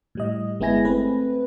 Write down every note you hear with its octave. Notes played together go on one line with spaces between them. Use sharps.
A2 G3 D#5
G1 G#3 B3 E4 G#5 A#6
A3 C4 B4